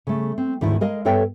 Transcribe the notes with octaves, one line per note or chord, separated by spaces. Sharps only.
C#3 A3
C4
D2 G#2 D#3 E3 A3 E4
G#3 A#4 D#5 F5
G2 B3 A4 C#5 E5 G5